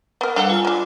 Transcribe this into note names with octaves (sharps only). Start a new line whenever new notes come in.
B3 A#4
G3 D4 A4 F5 F#5
F4 G#5
G#3 D4